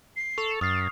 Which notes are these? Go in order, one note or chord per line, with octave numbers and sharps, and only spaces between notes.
C7
A4 C#6 F7
F#2 D#6 F6 A6 C7